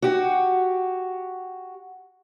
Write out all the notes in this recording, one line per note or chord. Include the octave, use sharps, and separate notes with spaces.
F#4 G4